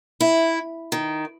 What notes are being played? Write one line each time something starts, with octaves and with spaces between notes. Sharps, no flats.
E4
D#3